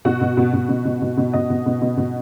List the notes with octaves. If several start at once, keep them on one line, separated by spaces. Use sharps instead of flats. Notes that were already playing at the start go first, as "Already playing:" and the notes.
B2 F#4
B2
B2
B2
B2
B2
B2
B2
B2 D#5
B2
B2
B2
B2